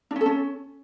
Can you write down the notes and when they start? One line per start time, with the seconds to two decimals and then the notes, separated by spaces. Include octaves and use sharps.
0.11 D4
0.16 C#4
0.21 A4
0.26 C#4